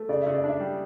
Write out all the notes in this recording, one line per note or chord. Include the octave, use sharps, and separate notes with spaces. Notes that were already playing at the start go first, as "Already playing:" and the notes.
Already playing: A3
C#3 D5
C#3 E5
D5
D4 E5
G3